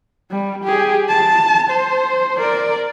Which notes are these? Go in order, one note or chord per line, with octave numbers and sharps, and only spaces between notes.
G3
G4 G#4
A5
C5
A#4 D5